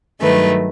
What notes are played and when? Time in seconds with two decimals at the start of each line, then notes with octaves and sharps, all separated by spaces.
0.20 G2 D#3 F#3 A3 B4